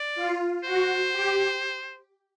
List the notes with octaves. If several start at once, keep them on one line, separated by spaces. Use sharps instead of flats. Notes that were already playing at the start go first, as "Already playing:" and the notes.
Already playing: D5
F4
F#4 C5
G4